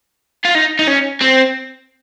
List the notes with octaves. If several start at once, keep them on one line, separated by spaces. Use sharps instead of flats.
F4
D#4
D#4
C#4
C4